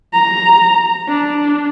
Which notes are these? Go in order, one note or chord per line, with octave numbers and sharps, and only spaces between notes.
A#5
D4